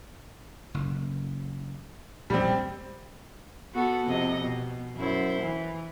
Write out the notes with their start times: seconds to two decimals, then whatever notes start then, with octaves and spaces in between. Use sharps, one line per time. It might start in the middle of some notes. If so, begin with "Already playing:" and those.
0.74 F#1
2.30 A#1 E2 G3 G#3 C4
3.73 B3 F#4 A4
4.06 F2 C3 D#5
4.40 B2
4.96 F#2 E4 C5
5.41 E3